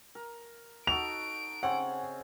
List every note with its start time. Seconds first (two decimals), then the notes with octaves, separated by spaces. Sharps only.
0.15 A#4
0.87 D#4 F#4 A4 D7 F7
1.63 C#3 C4 C#4 F#5